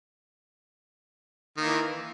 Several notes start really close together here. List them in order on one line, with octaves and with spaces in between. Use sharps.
D#3 A#3 E3